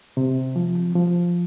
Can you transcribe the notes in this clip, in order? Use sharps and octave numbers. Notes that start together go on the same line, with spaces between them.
C3
F3
F3